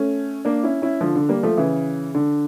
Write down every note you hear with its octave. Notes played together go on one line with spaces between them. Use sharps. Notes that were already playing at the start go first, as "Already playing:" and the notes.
Already playing: A3 C#4
A#3 D4
C#4 E4
C#4 E4
D3 F3
D3
G3 A#3
F3 A3
C#3 E3
D3